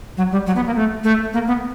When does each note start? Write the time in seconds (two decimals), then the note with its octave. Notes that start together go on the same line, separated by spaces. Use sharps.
0.17 F#3
0.32 G3
0.47 F#3
0.56 B3
0.66 A#3
0.76 A3
1.04 A3
1.33 A#3
1.47 B3